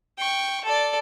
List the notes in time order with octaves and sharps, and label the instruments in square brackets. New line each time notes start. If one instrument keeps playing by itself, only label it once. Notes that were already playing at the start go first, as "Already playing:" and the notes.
[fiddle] G5 C#6
A4 D5